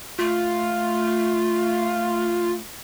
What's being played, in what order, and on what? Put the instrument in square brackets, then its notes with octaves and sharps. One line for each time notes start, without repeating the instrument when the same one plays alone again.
[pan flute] A3 [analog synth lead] F4